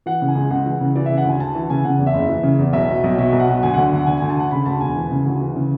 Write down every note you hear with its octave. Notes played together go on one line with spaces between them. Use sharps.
E3 F#5
C#3
G#5
C#2
C#2 F#5
E3
C#3
E3 D5
C#3 E5
F#5
D2 G#5
D2 A5
E3 A5
C#3 G#5
C#3 F#5
E2
E5
F#1
E3
C#3
E2
B1 E5
B2
B1
B2 E5
B1
F#5
B2
D2 G#5
D3 F#5
D2 F#5
D3 G#5
D2 G#5
A5
D3 F#5
C#3 B5
D2 A5
E1 G#5
E3
C#3
D2
E3
C#3